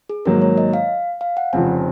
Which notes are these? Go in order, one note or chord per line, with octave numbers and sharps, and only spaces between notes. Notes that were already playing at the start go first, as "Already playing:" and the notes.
G#4
G#2 D#3 F#3 A#3 A#4
C#5
D#5
F5
F5
F#5
F1 F2 C#3 F3 C4 G#5